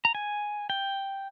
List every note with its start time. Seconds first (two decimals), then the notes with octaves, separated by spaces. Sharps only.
0.05 A#5
0.15 G#5
0.70 G5